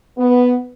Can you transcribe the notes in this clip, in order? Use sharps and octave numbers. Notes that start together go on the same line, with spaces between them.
B3